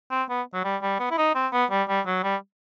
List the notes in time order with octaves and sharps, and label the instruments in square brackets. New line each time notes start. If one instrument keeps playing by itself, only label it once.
[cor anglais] C4
B3
F#3
G3
G3
B3
E4
D#4
C4
B3
G3
G3
F#3
G3